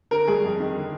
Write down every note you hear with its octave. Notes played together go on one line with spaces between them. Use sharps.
D3 A#4
G2 G#4
F2
D#3
D3